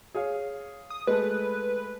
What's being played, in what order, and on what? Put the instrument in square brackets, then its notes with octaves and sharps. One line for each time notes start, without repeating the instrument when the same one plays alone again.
[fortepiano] G#4 C#5 F5
[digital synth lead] D#6
[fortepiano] G#3 A3 [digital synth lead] B4